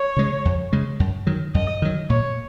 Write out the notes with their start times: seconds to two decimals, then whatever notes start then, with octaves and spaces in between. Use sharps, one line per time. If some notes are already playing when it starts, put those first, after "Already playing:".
Already playing: C#5
0.17 C#3 G#3
0.45 F2
0.73 C#3 G#3
1.00 F#2
1.27 D#3 F#3
1.54 F#2 D#5
1.82 D#3 F#3
2.10 A#2 C#5